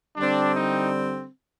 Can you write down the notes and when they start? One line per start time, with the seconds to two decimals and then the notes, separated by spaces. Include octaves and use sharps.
0.17 D3 G3 C4 D4
0.55 D#4